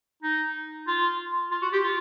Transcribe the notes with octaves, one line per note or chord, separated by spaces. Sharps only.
D#4
F4
F4
F#4
G4
F4